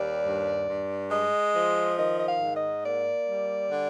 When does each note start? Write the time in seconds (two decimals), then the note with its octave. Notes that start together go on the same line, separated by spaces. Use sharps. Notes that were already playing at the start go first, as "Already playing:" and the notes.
Already playing: D#2 G3 D5
0.24 G2
0.68 G2
1.11 G#3 D#5
1.54 F3
1.97 D#3 D#5
2.18 D#5
2.26 F5
2.41 G#2
2.55 D#5
2.84 A#3 D5
3.27 G3
3.71 D3